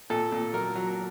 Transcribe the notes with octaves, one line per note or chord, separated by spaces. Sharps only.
A#2 A4
A#2
F#3 A#4
F#3